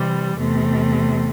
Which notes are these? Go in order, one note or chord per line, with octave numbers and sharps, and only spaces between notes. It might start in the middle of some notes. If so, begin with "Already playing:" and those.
Already playing: C3 E3 G3
E2 C3 A3